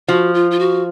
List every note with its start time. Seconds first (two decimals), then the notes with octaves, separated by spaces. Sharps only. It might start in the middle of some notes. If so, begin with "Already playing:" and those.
0.08 F3 F#4
0.34 F4
0.51 F4
0.59 F#4